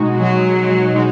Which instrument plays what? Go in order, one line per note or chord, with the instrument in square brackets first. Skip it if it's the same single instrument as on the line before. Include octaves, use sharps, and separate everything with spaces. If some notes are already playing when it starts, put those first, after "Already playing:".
Already playing: [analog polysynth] B2 G#3 D#4 F#4
[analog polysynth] B2 G#3 D#4 F#4 [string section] F#3
[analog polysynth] B2 G#3 D#4 F#4